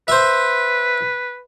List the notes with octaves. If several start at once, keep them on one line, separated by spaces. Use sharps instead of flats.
B4 C5 E5